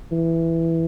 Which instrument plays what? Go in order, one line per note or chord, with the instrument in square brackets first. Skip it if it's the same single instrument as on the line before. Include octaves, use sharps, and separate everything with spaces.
[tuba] E3